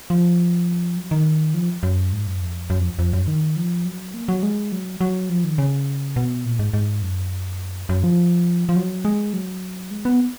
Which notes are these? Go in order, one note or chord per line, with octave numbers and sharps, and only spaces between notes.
F3
F#3
D#3
F3
F#2
G#2
F#2
F2
F#2
F2
F2
F#2
D#3
F3
F#3
A#3
F#3
G#3
F#3
F#3
F3
D#3
C#3
B2
A#2
G#2
G#2
F#2
F#2
F3
F3
F#3
G#3
F#3
G#3
B3